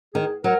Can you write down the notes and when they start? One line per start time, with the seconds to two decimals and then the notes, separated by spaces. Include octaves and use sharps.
0.14 D#3 G#4
0.44 F#3 A#4